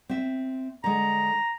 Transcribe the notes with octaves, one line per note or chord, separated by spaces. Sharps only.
C4 E5
D3 G#3 A#5